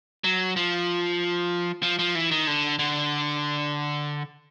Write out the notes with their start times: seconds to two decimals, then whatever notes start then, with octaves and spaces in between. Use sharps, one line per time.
0.24 F#3
0.56 F3
1.83 F3
1.99 F3
2.15 E3
2.31 D#3
2.47 D3
2.79 D3